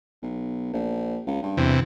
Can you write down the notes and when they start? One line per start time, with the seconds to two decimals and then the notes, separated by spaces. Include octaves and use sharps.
0.23 B1
0.73 A#1
1.27 C#2
1.43 G2
1.57 E2 C3